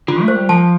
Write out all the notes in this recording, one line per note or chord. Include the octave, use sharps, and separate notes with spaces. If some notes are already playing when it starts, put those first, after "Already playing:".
D3 F4
A3
C5
G3
F3 A5